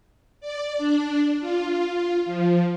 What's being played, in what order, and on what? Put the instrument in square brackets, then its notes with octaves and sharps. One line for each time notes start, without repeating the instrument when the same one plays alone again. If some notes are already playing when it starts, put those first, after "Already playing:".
[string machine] D5
D4
F4
F3